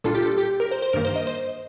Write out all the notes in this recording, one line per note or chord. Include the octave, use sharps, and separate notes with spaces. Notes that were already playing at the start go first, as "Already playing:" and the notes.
A#2 G3 D4 F4 A4
G4
A4
G4
A#4
C5
C5
G2 D#3 A#3 A#4
C5
D#5
C5